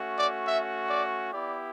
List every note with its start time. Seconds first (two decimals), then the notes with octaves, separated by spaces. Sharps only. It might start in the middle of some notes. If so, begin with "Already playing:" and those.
Already playing: A3 C#4 F#4
0.17 D5
0.46 E5
0.89 D5
1.32 B3 E4 G4 D5